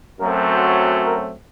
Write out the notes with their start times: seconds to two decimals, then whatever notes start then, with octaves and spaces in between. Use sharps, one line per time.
0.20 F#2 F#3 A3 C4 A#4
0.49 C5
1.05 A#4